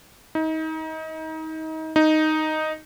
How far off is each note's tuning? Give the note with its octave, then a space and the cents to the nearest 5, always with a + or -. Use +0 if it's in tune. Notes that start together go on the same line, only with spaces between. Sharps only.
D#4 +30
D#4 +0